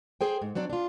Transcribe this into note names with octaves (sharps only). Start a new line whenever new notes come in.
G#4 C5 G5
G#2
F#3 C4 D4
D4 F4